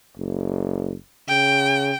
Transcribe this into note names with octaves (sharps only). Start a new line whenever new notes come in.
F#1
C#3 G5